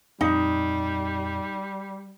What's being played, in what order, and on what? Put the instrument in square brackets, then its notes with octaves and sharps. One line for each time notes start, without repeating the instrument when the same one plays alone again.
[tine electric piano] F2 A#2 [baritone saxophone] G3 [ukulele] D#4